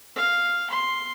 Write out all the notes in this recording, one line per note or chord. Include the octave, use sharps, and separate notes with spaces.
F5
C6